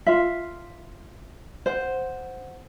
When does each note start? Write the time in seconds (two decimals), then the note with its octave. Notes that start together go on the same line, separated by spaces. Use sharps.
0.06 F4 E5
1.66 C5 F#5